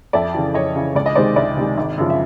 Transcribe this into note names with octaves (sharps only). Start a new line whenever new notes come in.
F2 D5 E5
C#3 E3
F2 C#5 D#5
C#3 E3
C#2 D5
D#5
C3 D#3 G#3 C5 D5
C#2 D5 E5
C3 D#3 G#3
G#1
F#2 C#3 F3
E5